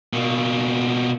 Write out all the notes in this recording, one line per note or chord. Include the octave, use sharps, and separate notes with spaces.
B2 A#3